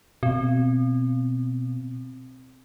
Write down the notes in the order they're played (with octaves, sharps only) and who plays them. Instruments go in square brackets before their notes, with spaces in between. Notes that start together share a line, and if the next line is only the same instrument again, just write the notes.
[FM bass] B2 [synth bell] C4